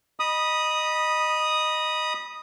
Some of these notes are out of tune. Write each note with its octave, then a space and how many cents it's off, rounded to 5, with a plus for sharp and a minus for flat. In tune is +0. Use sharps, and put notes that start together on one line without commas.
D#5 -15 B5 -20 D#6 +0